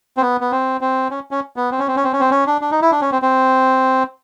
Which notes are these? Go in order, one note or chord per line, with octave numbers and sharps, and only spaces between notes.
C4
B3
B3
C4
C4
C#4
C#4
B3
C4
C#4
C4
C#4
C4
C#4
C4
C#4
D4
D4
D#4
E4
D4
C#4
C4
C4